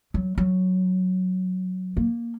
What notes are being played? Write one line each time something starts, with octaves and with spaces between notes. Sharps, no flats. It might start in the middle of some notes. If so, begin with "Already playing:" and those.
F#3
F#3
A#3